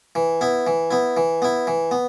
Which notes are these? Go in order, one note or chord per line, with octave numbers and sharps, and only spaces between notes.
E3
B3 E4
E3
B3 E4
E3
B3 E4
E3
B3